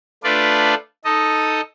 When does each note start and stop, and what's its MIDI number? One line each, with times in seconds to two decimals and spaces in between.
0.24 0.74 57
0.24 0.74 62
0.24 0.74 65
0.24 0.74 71
0.24 0.74 74
1.05 1.61 63
1.05 1.61 69
1.05 1.61 75